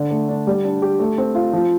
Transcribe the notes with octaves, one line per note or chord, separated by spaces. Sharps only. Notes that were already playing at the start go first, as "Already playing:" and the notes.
Already playing: D3
A3
D4
G3
D4
G4
A3
C4
F4
F3